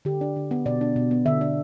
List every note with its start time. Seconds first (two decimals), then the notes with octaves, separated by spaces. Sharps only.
0.05 D3 G4
0.21 D4
0.36 D3
0.51 B3
0.66 B2 D5
0.81 D4
0.96 B2
1.11 B3
1.26 D3 E5
1.41 D4